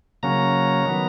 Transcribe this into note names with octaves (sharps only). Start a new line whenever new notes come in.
C#3 F#3 A#3 C#4 A#5
D#3 F#3 B3